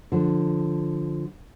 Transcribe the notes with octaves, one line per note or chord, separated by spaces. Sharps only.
D3 F3